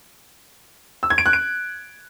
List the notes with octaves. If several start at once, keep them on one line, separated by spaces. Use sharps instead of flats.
E6
G#6
D7
F#6
D7